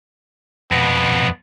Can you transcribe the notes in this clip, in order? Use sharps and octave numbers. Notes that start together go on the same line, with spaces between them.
F2 B2 B3